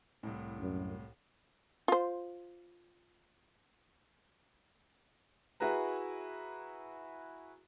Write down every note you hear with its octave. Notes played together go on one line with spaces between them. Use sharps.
C2 A2
F#2
F4 C5
E4 F#4 G#4 B4 A#5